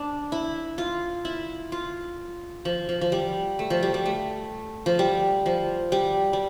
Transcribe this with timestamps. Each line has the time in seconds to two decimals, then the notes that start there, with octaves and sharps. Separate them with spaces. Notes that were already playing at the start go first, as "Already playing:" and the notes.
Already playing: D4
0.32 E4
0.78 F4
1.25 E4
1.72 F4
2.65 F3
2.89 F3
3.01 F3
3.12 G3
3.59 A3
3.70 F3
3.83 G3
3.94 G3
4.05 A3
4.86 F3
4.99 G3
5.46 F3
5.92 G3
6.33 G3